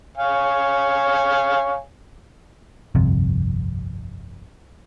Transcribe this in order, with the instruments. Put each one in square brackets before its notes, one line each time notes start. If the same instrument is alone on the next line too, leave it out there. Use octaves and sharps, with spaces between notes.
[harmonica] C#5 F5 G#5
[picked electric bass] G1 C2 F2 C3